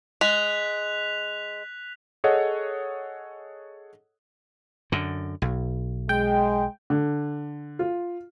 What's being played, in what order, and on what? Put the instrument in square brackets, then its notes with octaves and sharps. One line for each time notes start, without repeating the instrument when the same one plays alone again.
[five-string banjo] G#3 [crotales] F#6 B6 F7
[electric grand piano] G#4 A4 C#5 D#5 F#5
[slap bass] F#2 D3
B1
[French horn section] G#3 [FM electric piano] G5
[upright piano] D3
F4